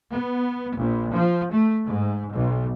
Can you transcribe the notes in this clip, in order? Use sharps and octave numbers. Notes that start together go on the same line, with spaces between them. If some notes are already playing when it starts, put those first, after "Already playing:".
B3
A#1
F3
A3
G#2
B1